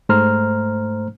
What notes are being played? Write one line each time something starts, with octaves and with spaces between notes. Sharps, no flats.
G#2 A3 C5 A#5 F6